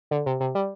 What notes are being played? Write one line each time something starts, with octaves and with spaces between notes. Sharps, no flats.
D3
C3
C3
G3